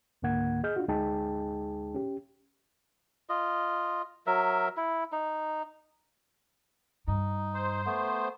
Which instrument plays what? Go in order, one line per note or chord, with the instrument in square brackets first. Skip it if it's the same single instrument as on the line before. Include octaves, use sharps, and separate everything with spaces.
[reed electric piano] C#2 G#2 D3 A#3 F#5 G#6
G#4 D#5 F6 G6
D4 F4 F#4
D2 G#3 D#4 G#4 G5 A5
C#4 G4
[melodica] F4 D#5
F#3 A#4 E5
E4
D#4
[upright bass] G2 [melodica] D#4
[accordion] C5
[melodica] A3 B3